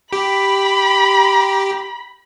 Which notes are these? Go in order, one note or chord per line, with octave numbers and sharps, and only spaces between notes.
G4 B5